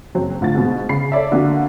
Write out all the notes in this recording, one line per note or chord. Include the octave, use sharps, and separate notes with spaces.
F#1 F#3 C4
A2 D3 F4 A6
G#2 B2
C#3 B5 C7
A4 C#5 D5 E5
D3 A#3 D4 F#4